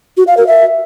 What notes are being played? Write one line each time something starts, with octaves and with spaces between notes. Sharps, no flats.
F#4
F5
A#4
E5